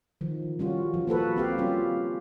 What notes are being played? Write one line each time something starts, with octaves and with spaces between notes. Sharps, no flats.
D#3 F3
G3 C#4 F4 F#4
F3
A#3 F#4 A4 B4
C4 G4 F5
G3 C#4 F4